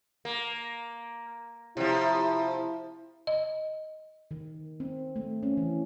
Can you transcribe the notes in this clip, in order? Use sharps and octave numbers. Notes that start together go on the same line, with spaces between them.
A#3
C3 F3 E4
D#5
D#3
C4
A3
C#4
E3